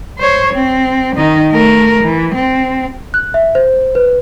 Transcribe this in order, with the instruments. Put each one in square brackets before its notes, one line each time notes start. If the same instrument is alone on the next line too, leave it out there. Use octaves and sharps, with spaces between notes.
[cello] C5 C#5
C4
D#3 D#4
A3 A#4
E3
C4
[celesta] F#6
E5
C5
B4